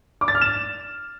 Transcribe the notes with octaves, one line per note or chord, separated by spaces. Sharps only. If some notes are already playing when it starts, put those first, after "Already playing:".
D6
A6
F6
E7